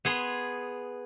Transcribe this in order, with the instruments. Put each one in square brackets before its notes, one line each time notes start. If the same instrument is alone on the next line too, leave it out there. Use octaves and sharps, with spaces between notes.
[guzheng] B3 G#4 C6